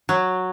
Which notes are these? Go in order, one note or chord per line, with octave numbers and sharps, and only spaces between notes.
F#3